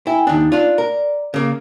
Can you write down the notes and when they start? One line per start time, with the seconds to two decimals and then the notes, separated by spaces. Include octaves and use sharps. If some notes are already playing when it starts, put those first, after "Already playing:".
0.07 E4 G5 G#5
0.27 D#2 D4 D#4
0.52 D4 F4 D5
0.78 A#4
1.34 C#3 A#3